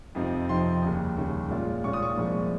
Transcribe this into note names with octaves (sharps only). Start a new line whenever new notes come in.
F2 C3 F3 C4 D#4
F2 C3 F3 C4 D#4 C6
D#2 C#3 G3
D#2 C#3 G3
A#2 G#3 C#4 F4
A#2 G#3 C#4 F4 C#6
D#6
C#6
C2 A#2 F3 G#3